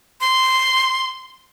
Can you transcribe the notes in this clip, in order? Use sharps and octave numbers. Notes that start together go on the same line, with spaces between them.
C6